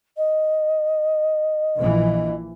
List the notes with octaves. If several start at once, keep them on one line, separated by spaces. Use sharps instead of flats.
D#5
A#1 E3